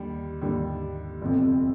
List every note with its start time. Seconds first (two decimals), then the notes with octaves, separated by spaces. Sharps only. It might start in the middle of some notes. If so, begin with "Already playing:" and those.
Already playing: D#2 D3 G3
0.41 D#2 D3 G3
1.22 G1 F2 C3